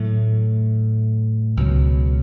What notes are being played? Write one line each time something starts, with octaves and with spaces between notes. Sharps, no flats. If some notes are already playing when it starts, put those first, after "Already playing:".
Already playing: A2 F#3 A3
C#2 B2 F#3